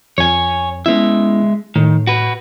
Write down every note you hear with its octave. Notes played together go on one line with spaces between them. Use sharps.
F2 C#5 G#5
G#3 B3 C#4 E4 E5
A2 D#3
F#4 B4